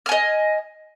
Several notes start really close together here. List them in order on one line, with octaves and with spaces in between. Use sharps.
F6 G#5 D#5